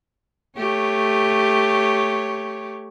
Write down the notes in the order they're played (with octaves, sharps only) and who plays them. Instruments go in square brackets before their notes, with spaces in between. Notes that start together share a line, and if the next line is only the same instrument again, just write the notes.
[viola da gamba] A3 G4 C#5